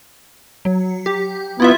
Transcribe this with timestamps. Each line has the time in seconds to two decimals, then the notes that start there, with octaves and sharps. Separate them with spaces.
0.65 F#3
1.06 G4
1.60 B3 E4 F4 E5